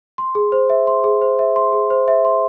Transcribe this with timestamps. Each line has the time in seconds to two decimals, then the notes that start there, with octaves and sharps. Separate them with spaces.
0.18 C6
0.35 G#4
0.52 C5
0.70 E5
0.87 C6
1.04 G#4
1.22 C5
1.39 E5
1.56 C6
1.72 G#4
1.90 C5
2.08 E5
2.25 C6